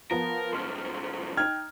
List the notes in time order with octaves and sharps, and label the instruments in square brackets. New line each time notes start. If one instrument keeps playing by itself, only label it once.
[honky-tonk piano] F3 B3 [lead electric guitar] A#4
[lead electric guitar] D2 G#2 [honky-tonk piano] C6 F6
[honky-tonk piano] D#4 [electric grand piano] G5 F6 G#6